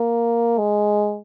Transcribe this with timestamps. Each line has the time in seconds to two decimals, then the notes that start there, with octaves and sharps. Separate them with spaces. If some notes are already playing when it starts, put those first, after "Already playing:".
Already playing: A#3
0.58 G#3